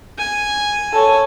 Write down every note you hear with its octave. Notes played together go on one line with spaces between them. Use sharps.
G#5
A4 C#5